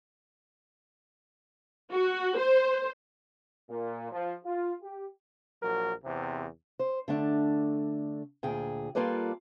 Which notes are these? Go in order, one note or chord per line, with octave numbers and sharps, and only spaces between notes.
F#4
C5
A#2
F3
F4
G4
A#1 F#3 A#4
E2 C3
C5
D3 A3 D4
D2 A#2 G#4 G5
G3 A#3 F4 A4 B4 D5